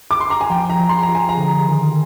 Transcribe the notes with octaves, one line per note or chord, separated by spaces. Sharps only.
D6
C6
A#5
G#5
F3 G5
A#5
F3
C6
A#5
F3
G#5
A#5
D3
D#3